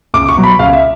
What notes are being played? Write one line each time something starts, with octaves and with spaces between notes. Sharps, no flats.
C#2 D6
C#6
B2 F#3
B5
C#2 F5
E5